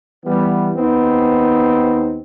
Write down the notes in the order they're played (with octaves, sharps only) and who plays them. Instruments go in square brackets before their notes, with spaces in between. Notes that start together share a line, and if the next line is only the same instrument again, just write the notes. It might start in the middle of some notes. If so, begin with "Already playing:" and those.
[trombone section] E3 G3 B3
D#2 B3 C4 D#4